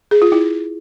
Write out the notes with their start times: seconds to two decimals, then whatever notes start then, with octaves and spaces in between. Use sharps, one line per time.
0.11 G#4
0.22 F4
0.32 E4